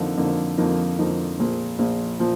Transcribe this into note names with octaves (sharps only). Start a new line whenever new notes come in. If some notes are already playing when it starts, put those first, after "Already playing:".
Already playing: F2 D3 F3 A#3 D#4
F2 D3 F3 A#3 D#4
F2 D3 F3 A#3 D#4
F2 D3 F3 A#3 D#4
A#1 A#2 F3
A#1 A#2 F3
A#2 F3